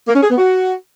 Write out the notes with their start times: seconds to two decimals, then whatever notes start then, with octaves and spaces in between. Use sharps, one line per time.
0.08 A#3
0.15 C#4
0.23 G#4
0.30 B3
0.38 F#4